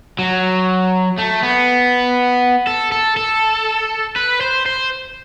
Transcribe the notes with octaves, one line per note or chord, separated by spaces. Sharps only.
F#3
A3
B3
A4
A4
A4
B4
C5
C5